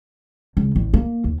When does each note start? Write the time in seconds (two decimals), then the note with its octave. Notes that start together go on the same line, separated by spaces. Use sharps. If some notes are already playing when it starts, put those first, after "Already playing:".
0.57 C#2
0.76 A1
0.94 A#3
1.24 D#2